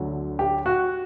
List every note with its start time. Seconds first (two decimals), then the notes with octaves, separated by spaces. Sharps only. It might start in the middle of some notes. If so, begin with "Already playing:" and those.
Already playing: D2 D3 F#3
0.39 G4
0.66 F#4